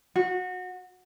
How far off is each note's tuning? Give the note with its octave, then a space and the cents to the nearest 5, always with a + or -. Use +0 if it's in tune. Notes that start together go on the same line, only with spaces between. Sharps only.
F#4 -20